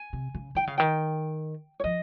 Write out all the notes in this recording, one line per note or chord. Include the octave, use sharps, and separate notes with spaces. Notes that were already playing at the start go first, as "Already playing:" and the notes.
Already playing: G#5
C3
C#3
D#3 G5
C#3 F5
D#3 G5
C#5
F3 D#5